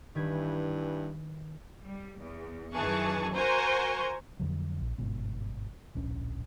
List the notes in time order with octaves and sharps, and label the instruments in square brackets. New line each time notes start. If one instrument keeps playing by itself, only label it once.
[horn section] G2 E3 [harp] D#3 B4 G#6
[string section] G3
E2
F#2 D#3 E3 G#4 A5 C#6
F#4 A#4 C5 G#5 A#5 C#6
[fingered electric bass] F2 D3 F#3
A#1
G1 G#2 B2
D1 A#1 C#4 D4